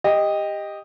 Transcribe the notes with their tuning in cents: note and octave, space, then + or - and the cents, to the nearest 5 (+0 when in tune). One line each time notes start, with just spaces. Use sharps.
G4 +15 D#5 +0